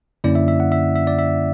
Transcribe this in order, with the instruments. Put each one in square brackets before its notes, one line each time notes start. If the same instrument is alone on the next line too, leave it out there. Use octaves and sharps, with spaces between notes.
[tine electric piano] F#2 D3 A#3 C#4 E4 D5
E5
E5
F#5
E5
E5
D5
E5